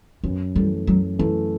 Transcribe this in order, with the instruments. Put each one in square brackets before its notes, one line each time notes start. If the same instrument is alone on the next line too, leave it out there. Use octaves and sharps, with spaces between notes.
[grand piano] F#2 [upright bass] B3
[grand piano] E3 A3 [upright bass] G3
[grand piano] F#2 [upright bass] F#3
[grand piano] E3 A3 [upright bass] C#4